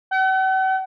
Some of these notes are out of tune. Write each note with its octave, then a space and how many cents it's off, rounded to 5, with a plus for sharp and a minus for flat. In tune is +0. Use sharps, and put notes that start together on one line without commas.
F#5 +45